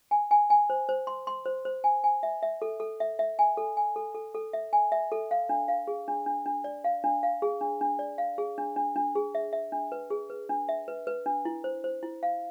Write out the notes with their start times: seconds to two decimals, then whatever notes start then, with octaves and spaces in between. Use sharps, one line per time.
0.11 G#5
0.31 G#5
0.50 G#5
0.70 C5
0.89 C5
1.07 C6
1.27 C6
1.46 C5
1.65 C5
1.84 G#5
2.04 G#5
2.23 E5
2.43 E5
2.62 A4
2.80 A4
3.00 E5
3.19 E5
3.39 G#5
3.57 A4
3.77 G#5
3.96 A4
4.14 A4
4.35 A4
4.53 E5
4.73 G#5
4.92 E5
5.12 A4
5.31 F5
5.49 D4
5.68 F5
5.87 G#4
6.08 D4
6.26 D4
6.46 D4
6.64 D5
6.84 F5
7.04 D4
7.23 F5
7.42 G#4
7.61 D4
7.81 D4
7.99 D5
8.18 F5
8.38 G#4
8.58 D4
8.76 D4
8.96 D4
9.15 G#4
9.35 E5
9.53 E5
9.72 D4
9.92 B4
10.10 G#4
10.30 B4
10.49 D4
10.69 E5
10.88 B4
11.07 B4
11.26 D4
11.45 E4
11.64 C5
11.84 C5
12.03 E4
12.23 F5